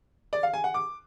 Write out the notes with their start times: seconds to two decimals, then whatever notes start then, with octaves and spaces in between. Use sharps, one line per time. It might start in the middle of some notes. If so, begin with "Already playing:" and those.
0.33 D5
0.43 F5
0.54 G#5
0.64 F#5
0.74 D6